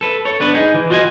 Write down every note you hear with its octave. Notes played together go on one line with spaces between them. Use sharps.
A4 B4
A4 C#5
B3 D4 B4
D#4 G#4
E3
F4 F#4 D#5 G5 G#5